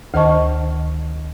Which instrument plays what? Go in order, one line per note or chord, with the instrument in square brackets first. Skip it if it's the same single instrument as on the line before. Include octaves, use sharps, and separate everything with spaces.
[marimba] D2 D#3 C5 D#5 A5 C#6